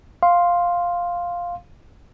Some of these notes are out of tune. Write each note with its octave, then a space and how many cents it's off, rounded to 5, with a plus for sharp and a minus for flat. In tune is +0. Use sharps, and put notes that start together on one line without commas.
F5 +0 C6 +5